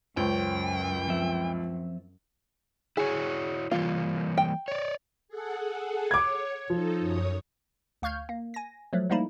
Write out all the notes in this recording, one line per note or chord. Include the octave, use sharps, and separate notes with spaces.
C#2 F#2 C5 C#5 G5
F3 C4 E5
E4 F#4 G#4 C#5
E3 G3 A#3 F4
G5
C#5 D5
G#4 A4 F#5
C#5 D6 G#6
F3 D#4 A4
F#2 C#5 D#6
D2 F5 C#6 F6 G6 G#6
A#3
G#5 A#6
F3 F#3 A3
F3 G3 A3 A#3 D#4 E4